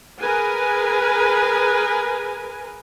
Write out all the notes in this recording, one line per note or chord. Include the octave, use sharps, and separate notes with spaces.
G#4 A#4 B4 G#5